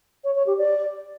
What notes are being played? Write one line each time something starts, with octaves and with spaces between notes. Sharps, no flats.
C#5
C#5
G4
D5